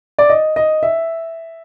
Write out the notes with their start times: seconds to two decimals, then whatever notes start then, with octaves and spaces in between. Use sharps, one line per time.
0.18 D5
0.30 D#5
0.56 D#5
0.83 E5